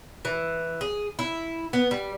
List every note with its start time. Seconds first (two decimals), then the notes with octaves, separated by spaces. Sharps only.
0.25 E3
0.81 G#4
1.19 E4
1.73 B3
1.91 G3